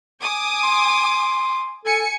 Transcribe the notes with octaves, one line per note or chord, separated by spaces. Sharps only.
G#5 D6 D#6
C6
A4 G#5 C#7